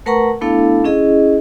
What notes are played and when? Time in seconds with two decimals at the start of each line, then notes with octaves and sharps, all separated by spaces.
0.06 A3 A#4 B4 F#5 A#5 C#6
0.42 A3 B3 D4 E4 A4 F5
0.84 C#4 E4 G#4 D#5